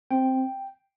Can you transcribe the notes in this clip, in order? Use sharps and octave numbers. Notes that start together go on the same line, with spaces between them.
C4 G5